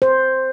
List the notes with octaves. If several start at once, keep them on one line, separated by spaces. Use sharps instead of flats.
C5